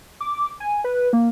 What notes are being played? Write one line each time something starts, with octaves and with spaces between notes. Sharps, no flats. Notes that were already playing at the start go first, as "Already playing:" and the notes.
D6
G#5
B4
A#3